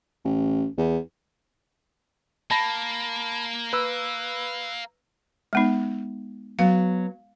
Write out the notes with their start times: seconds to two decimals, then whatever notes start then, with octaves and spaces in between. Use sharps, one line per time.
0.25 A1
0.77 E2
2.51 A#3 A5 B5 A#6
3.73 B4 E6
5.53 G#3 B3 D#4
6.59 F#3 B3 F5